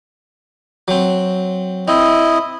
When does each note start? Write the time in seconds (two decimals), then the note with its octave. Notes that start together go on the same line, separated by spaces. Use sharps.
0.88 F#3 C4
1.88 C4 E4 D#5